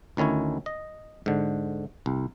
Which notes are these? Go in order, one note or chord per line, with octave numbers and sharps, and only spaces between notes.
D2 D#3 C#4 E4 C#5
D#5
G#2 D3
C2